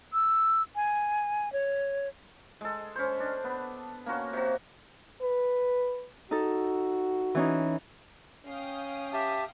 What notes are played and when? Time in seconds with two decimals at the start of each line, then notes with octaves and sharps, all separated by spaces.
0.13 E6
0.76 G#5
1.53 C#5
2.61 G#3 A4
2.96 C#4 C5
3.20 D4
3.44 B3
4.06 A#3 C#4 F#4 C6
4.33 C3 F#4
5.22 B4
6.31 D#4 F#4 A4
7.35 E3 C#4 D#4
8.46 C#4 F5 G5 D#6
9.13 G4 E5 A5